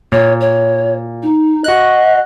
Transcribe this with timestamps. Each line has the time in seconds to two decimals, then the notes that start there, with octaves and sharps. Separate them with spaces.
0.12 A#2 C#5
0.41 C#5
1.23 D#4
1.64 F#4 D#5 F#6